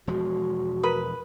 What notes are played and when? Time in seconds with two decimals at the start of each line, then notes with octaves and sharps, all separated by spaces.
0.07 E1 F3 G#3 F#4
0.83 A#4 B4 B5 D#6